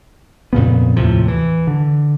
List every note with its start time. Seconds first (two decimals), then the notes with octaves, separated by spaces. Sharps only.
0.53 F2 A#2 C#3 B3
0.96 D#2 A2 C3 F3
1.28 E3
1.67 D3